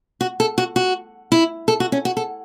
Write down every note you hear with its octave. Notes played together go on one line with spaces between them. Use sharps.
F#4
A4
F#4
F#4
E4
A4
F#4
C#4
F#4
A4